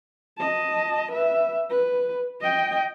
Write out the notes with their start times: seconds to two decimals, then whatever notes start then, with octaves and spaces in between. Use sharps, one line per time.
0.38 D#5 A5
1.12 B4 E5
1.70 B4
2.41 D#5 G5